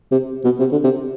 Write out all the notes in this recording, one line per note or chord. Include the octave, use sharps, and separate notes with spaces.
C3
B2
C3
D3
C3